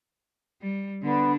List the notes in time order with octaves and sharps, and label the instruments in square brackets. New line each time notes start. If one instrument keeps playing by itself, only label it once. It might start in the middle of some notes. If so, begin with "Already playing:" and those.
[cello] G3
[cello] D3 D4 [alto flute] B3